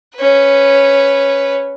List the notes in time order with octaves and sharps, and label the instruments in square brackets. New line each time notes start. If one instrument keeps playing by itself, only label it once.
[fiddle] C#4 B4